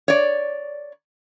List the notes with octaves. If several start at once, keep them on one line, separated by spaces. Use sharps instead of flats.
C#5 D5